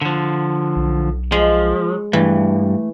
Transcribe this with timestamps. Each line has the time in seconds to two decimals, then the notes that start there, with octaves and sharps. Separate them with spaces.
0.01 D3 F3
0.76 B1
1.32 F3 G#3
2.13 G2 E3 A3